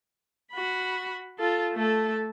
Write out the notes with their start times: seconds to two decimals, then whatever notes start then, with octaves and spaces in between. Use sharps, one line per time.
0.52 F#4 B5
1.39 F4 A4
1.74 A3 A4